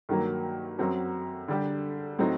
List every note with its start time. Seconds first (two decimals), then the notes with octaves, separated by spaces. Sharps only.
0.09 G2 D#3 F#3 A#3
0.79 F#2 F#3 C4 F#4
1.48 D3 G3 D4 G4
2.19 A2 F#3 C4 D#4